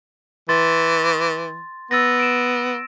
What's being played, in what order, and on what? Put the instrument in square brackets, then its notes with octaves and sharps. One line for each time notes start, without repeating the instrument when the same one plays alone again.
[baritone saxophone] E3 [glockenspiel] C6 A6
[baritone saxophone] B3 [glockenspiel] E6 A6 A#6
[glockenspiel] D7 E7